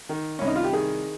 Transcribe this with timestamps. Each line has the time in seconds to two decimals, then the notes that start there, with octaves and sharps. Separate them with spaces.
0.09 D#3
0.39 C2 C#4
0.47 D#4
0.56 F4
0.64 G4
0.73 D#3 G#4